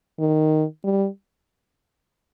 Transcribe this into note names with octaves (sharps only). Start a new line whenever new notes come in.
D#3
G3